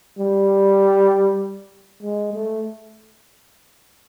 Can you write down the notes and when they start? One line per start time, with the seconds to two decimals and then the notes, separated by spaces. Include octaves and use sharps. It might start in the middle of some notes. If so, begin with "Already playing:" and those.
0.19 G3
2.03 G#3
2.34 A3